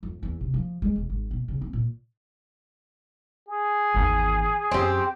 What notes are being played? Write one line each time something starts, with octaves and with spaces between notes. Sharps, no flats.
F2
E2
C3
F3
G#3
E1
G#1
B2
C#3
C4
A#2
G#4
G#1 E2
F#2 C4 G4